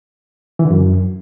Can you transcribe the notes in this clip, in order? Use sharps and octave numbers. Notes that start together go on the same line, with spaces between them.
E3
D3
F#2